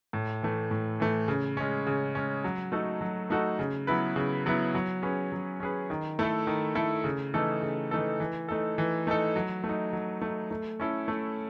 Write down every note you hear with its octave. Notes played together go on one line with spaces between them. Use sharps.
A2
E3 A3
A2
E3 A3
C#3
G#3 C#4
C#3
G#3 C#4
F#3
A3 D#4 F#4 A4
F#3
A3 D#4 F#4 A4
C#3
F#3 B3 E4 B4
C#3
F#3 B3 E4 B4
F#3
C#4 G#4 B4
F#3
C#4 G#4 B4
D#3
A3 E4 A4
D#3
A3 E4 A4
C#3
E3 A3 D#4 A4
C#3
E3 A3 D#4 A4
E3
A3 D#4 A4
E3
A3 D#4 A4
F#3
A3
D#4
F#3
A3 D#4
A3
C#4 E4 A4
A3